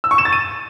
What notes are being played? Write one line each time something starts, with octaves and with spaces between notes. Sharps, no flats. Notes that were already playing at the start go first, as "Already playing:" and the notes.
E6
C#6
E7
A6
D#7